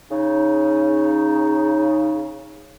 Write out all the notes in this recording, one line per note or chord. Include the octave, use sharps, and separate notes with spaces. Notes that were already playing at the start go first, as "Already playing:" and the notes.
C#3 D#4